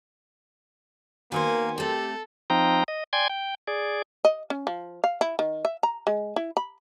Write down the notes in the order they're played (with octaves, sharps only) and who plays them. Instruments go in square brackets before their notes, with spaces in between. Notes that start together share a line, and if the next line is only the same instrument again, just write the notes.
[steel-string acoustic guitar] D#3 B3 C5 [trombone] A#3 [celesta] F#4 A#4 C6 [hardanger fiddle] G#5
[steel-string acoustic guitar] A3 C4 [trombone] G4 [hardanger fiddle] A4
[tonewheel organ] F3 C4 D#4 G5 A#5
D#5
D5 G5 G#5 C6 G#6
G5
G#4 D5
[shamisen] D#5
C#4
F3
F5
E4
D#3
E5
A#5
G#3
E4
B5